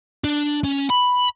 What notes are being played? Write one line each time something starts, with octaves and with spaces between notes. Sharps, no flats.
D4
C#4
B5